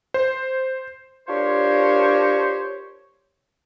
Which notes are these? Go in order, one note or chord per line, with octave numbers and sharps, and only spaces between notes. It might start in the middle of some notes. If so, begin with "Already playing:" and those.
C5
D4 F4 G4 A#4 C5 C#5